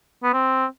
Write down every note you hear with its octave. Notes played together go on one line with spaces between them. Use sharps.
B3
C4